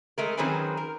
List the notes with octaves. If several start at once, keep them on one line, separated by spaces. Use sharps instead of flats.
G#3 A3 A#4
D#3 F#3 C4 C#4 G#4 B4
A#4